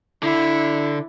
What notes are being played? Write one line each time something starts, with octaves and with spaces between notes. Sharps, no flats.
D3 E4